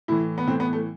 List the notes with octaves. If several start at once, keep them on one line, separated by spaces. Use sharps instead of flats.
A2 E3 E4
B3
A2 E3 C4
B3
A3